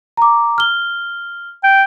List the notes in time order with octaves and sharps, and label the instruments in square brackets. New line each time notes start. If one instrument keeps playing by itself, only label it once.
[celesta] A#5 D6
F6 G7
[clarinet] G5